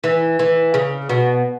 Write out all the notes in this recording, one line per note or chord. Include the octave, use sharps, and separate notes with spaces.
E3
E3
C#3
B2